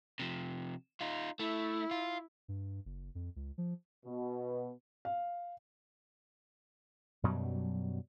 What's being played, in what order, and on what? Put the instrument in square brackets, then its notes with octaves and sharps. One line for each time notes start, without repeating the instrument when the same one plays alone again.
[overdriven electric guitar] C3 F3
D#4 F4
[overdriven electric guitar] A3 [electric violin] E4
[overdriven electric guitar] F4
[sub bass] G2
F#1
F2
C#2
F3
[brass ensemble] B2
[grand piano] F5
[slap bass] F#2 B2 F#3 G3